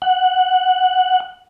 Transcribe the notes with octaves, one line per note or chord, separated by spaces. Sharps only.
F#5